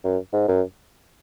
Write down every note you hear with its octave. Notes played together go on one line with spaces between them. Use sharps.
F#2
G#2
F#2